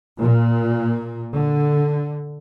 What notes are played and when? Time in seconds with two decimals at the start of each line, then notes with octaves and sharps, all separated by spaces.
0.19 A#2
1.36 D3